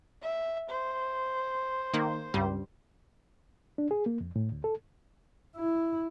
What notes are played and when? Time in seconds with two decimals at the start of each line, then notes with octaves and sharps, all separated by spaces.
0.22 E5
0.69 C5
1.94 D#3 A#3
2.34 C#2 G2 G3
3.78 D4
3.91 G#4
4.06 A#3
4.21 F2
4.36 A2
4.52 D2
4.64 A4
5.56 E4